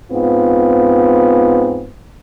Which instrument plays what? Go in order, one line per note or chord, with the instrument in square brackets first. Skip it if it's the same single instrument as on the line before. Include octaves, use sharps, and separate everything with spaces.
[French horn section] G#2 B3 C4 F4